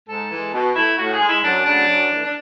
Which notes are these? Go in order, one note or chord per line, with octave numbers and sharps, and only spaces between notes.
G#2 A4
E3 G#3
B2
A3 E4
A2 F#4
G#4
G#3
E4
F#2 D4
C#3 F#3 A3 D4
F#2
E3 A3
D4